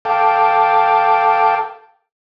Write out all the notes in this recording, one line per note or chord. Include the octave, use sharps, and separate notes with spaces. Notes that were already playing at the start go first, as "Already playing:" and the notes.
A4 F5 G5 A5 D6